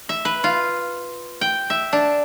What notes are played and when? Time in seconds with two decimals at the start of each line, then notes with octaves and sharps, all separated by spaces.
0.09 E5
0.25 B4
0.44 F4
1.41 G5
1.70 E5
1.93 D4